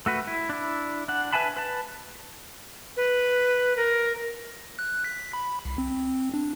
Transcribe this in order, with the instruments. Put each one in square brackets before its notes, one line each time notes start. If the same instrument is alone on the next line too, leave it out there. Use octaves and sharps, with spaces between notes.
[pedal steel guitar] A3 F#4 B4
E4
D4 E4
D4 F#5
B4 E5 G#5 A5 B5
B4 A5
[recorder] B4
A#4
[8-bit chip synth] F#6
B6
B5
C2
C4
D4